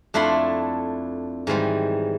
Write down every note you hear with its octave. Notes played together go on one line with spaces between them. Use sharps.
F2 A3 D4 E4 B5 C6
G#2 D#3 E3 G3